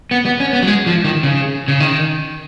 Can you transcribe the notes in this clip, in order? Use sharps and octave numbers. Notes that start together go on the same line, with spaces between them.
B3
B3
C#4
B3
F#3
G#3
F3
D#3
C#3
C#3
D#3